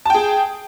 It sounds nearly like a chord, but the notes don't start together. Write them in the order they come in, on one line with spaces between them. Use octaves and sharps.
A5 G5 G#4